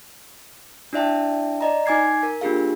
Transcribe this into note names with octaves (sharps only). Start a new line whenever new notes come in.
D4 E4 D5 E5 G5 A5
D5 D#5 A#5
D#4 G#5 D6 G#6 C7
A#4
A#3 D4 F4 G4 G#4 F5